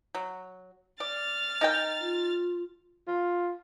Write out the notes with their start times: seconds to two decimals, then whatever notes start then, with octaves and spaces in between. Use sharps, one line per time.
0.15 F#3
1.00 D5 F6 A6
1.61 D#4 A#4 G5
2.00 F4
3.07 F4